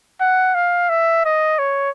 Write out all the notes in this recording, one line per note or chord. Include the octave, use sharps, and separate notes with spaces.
F#5
F5
E5
D#5
C#5